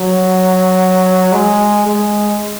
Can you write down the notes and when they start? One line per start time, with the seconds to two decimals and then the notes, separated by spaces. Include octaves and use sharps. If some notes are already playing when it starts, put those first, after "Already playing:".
Already playing: F#3
1.33 G#3
1.87 G#3